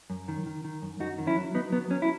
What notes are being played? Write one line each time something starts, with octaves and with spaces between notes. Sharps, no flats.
F#2
D#3
D#3
D#3
F#2
F#2 D#4 F#4
D#3
C#4 E4
F#3
F#3 B3 D#4
F#3 B3
F#3 C#4
E4